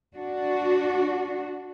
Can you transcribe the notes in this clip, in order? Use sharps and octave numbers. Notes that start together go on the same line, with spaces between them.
D4 F#4